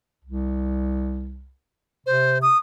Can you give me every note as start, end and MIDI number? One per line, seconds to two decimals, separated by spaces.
0.25 1.51 36
2.06 2.50 48
2.06 2.38 72
2.42 2.57 87